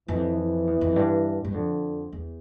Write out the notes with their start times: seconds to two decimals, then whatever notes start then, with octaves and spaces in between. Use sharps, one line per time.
0.08 F2 E3
0.38 E3
0.67 E2
0.81 F2
0.96 G2
1.45 G2
1.54 F2 D3
2.12 E2